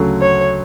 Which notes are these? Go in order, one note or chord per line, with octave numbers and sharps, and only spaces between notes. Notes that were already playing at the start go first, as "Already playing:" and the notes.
Already playing: D2 C#3 F#3 A3
C#5